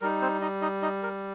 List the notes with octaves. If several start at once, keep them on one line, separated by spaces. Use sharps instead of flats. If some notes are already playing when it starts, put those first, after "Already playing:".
G3 D#4 A#4
C4 C5
D#4 D#5
D#4 D#5
D#4 D#5
A#4